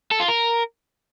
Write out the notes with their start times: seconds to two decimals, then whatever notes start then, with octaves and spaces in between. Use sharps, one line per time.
0.11 A4
0.20 F4
0.28 A#4